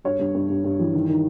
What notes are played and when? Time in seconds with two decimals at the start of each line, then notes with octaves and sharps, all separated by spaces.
0.05 G2 C#5
0.19 G2
0.35 G2
0.49 G2
0.64 G2
0.79 E3
0.94 D#3
1.09 D#3